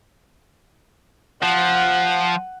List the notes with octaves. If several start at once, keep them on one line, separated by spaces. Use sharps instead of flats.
F3 F#5